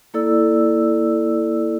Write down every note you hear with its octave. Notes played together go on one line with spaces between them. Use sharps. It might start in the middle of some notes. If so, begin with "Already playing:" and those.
A#3 E4 A4 D5 E6